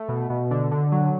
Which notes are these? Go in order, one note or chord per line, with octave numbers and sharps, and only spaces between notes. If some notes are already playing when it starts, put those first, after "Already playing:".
Already playing: A3
B2
B2
D3
D3
F#3